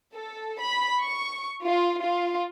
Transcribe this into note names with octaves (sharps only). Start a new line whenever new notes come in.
A4
B5
C#6
F4
F4